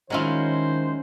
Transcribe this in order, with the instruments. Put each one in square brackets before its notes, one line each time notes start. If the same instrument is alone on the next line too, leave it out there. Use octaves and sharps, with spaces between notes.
[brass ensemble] D#3 C5 [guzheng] F#3 C#4 E4 [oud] G#3 F4